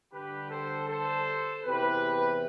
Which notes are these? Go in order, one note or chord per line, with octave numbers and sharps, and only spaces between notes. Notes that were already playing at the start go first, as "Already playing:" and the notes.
G2 D3 G4 B4
A4 C5
A4 C5
E2 C3 E3 G4 B4